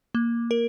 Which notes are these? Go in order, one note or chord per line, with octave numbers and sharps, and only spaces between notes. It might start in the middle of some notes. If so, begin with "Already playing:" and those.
A#3
A#4